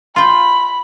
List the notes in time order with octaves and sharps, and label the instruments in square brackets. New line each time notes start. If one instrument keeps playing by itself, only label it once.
[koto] F4 G5 [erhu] B5 [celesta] C6